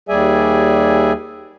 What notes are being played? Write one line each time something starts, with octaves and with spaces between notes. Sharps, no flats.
D#2 G3 G#4 D5 E5 G#5